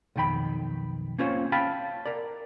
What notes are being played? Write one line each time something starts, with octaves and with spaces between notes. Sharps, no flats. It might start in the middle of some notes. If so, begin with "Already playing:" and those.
B1 F2 D#3 G5 B5
A#3 C4 C#4 F4 C5 C#5
E5 F5 G5 A5 B5
A#4 D5